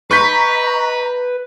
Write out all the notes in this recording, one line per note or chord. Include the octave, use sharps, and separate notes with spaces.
B4 D#5 A#5 C#6 G6 B6